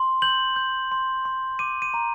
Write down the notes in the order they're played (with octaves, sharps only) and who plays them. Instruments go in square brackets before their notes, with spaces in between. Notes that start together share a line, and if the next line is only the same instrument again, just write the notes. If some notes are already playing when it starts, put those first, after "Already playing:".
Already playing: [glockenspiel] C6
G6 F#7
G6
C6
C6
D6 D#7
D#7
A#5